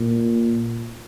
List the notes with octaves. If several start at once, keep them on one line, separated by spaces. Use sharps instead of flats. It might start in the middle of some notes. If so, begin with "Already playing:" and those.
Already playing: A#2